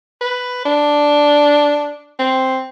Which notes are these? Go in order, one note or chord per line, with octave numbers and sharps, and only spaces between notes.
B4
D4
C4